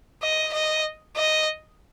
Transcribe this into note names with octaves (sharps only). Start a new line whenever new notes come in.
D#5
D#5
D#5